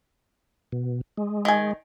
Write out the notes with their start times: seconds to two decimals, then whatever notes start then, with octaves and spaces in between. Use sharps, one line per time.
0.72 B2
1.18 G#3
1.45 D#3 G#5